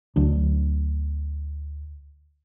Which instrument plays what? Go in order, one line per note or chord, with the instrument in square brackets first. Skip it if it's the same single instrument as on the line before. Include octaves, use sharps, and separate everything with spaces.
[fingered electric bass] D2 F#3 D4